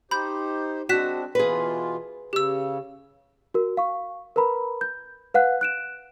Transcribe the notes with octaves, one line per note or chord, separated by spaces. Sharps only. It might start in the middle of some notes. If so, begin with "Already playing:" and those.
D#4 G4 C5 B5 G6
G#3 C4 D4 F#4 F#6 B6 E7
B2 E3 F4 G#4 B4
C#3 G4 E6
F#4 A#4
F5 C#6
A#4 B4 A#5 B5
G6
B4 F5 F#5 F#6
F#6 D7 E7